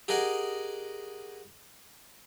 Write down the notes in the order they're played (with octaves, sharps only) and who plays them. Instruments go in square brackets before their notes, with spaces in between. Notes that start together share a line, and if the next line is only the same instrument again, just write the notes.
[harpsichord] G4 G#4 A#4 D#5 F#5 G#5